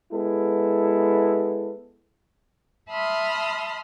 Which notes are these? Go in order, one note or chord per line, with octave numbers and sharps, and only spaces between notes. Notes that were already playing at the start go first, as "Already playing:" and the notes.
G#3 B3 E4 A4
E5 A5 B5 C6 D#6 F6